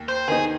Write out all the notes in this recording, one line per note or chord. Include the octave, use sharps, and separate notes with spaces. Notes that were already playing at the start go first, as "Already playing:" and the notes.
Already playing: D#2
C5
D#3 B3 D#4 G#4